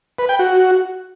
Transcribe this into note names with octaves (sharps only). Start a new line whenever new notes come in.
B4
G5
F#4